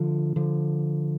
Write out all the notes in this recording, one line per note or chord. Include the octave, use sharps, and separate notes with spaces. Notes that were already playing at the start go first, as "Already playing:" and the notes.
Already playing: D3 F3
D3 F3